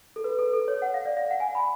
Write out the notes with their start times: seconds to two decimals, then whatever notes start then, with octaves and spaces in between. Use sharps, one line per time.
0.16 A4
0.24 B4
0.39 A4
0.53 A4
0.68 C#5
0.82 F#5
0.94 F5
1.05 D5
1.17 F5
1.31 F#5
1.40 G#5
1.55 B5